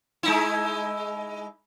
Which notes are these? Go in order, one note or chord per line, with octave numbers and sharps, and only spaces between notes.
G#3 D#4 E4